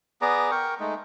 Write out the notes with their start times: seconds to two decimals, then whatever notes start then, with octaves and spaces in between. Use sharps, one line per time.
0.22 B3 G#4 D5 A#5
0.51 A#4 G5 C#6
0.80 G#3 A3 D#4